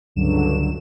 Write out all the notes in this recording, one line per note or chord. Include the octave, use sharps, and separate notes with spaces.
C#2 G2 D3 F#3 E7